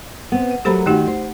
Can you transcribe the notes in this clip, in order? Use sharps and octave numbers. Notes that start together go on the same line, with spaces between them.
B3 C4
F#5
F#3 A3 G4 A#4 C5 B5
D#3 A3 D#4 F#4 G4
C5